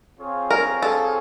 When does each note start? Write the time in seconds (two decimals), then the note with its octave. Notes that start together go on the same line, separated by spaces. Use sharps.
0.19 C4 F4 G#4 C#5 F5
0.50 A#4
0.82 A4